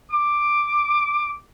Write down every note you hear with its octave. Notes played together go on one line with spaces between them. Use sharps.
D6